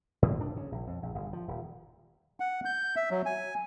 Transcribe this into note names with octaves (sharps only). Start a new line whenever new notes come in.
G#2
D4
C#3
A#1
F2
A#1
G1
F3
D#1
F#5
G6
E5
F#3
G#5